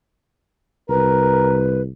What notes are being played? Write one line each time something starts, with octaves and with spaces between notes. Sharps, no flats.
C2 A#4 B4